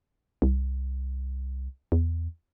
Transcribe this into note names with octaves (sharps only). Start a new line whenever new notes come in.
C2
E2